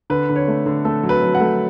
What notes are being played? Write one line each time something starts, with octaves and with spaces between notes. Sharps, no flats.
D3 B4
D3
C#5
A3
D3
A3 A4
F#3
B4
F#3
F#5
A3